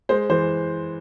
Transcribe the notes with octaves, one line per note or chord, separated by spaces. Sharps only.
G#3 C5
E3 C5